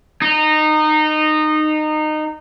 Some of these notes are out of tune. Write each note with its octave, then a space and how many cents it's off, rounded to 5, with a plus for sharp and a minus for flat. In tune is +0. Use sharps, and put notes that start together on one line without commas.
D#4 -20